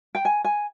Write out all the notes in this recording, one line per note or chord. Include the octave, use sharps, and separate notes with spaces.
G5
G#5
G#5